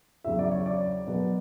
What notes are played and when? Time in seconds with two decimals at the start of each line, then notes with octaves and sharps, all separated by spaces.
0.24 E2 C#3 F#3 E5
0.39 D5
0.51 C#5
0.66 D5
1.07 B2 F#3 B3